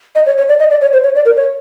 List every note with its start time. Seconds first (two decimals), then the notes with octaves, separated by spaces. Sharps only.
0.15 D#5
0.26 C#5
0.37 C#5
0.48 D5
0.60 D#5
0.70 D5
0.81 C#5
0.93 C5
1.04 C#5
1.15 D5
1.25 A#4
1.36 C#5